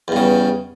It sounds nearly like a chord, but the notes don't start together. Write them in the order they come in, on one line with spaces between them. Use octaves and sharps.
E2 G2 C#3